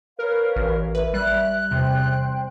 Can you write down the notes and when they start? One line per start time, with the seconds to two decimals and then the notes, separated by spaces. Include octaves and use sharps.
0.19 A#4 B4 C#5 F5
0.56 A1
0.95 B4 E5
1.14 G3 F#6
1.71 E2 C3 C5 G5